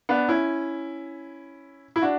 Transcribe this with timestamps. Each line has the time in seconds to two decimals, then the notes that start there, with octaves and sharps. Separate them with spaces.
0.09 B3 D4
0.29 C#4 E4
1.96 E4
2.01 D4 F#4